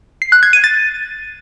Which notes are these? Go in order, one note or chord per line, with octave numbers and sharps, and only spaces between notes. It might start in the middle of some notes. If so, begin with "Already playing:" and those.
C7
F#6
G#6
D#7
A6